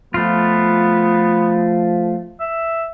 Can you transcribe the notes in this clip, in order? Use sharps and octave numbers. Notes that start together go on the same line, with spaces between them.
F3 A3 B3 F4
E5